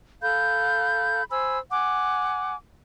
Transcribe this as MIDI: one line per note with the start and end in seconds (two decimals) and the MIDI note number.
0.22 1.23 69
0.22 1.23 77
0.22 1.23 83
0.22 1.23 91
1.30 1.58 72
1.30 1.58 80
1.30 1.58 83
1.30 1.58 88
1.71 2.55 78
1.71 2.55 80
1.71 2.55 86